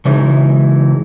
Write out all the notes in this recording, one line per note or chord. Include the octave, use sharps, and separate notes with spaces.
C#3 E3 F#3 G#3 D#4